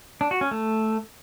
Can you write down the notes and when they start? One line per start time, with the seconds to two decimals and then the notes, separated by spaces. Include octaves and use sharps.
0.21 D4
0.31 F#4
0.41 C#4
0.51 A3